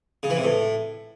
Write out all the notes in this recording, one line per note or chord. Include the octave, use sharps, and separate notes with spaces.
C#3
E3
C3
A2